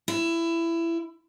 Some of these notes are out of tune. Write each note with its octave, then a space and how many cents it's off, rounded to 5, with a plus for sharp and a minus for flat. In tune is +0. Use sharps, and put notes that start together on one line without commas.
E4 +20